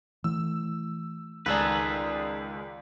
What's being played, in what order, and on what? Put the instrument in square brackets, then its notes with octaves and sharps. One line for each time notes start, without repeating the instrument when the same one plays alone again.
[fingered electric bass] E3 A3 [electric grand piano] E6
[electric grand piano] C#2 G#3 D5 [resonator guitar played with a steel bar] D#3 D#4 [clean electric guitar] G#4 A4 B4